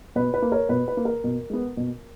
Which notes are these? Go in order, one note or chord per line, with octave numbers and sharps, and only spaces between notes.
B2 B4
B4
A#3
A#4 C#5
B2 B4
B4
A#3
A#4
B2
G#3 B3
B2